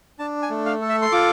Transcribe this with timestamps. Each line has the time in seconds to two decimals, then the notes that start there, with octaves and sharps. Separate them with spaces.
0.19 D4 A5
0.42 G#5
0.50 A3
0.66 F5
0.81 A4
0.89 E5
1.02 C6
1.12 F4 D6